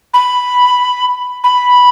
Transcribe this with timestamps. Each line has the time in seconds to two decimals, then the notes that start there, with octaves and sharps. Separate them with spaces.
0.14 B5
1.44 B5